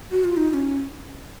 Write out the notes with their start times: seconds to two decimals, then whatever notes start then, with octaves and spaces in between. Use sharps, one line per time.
0.11 F#4
0.24 F4
0.37 D#4
0.50 D#4
0.54 C#4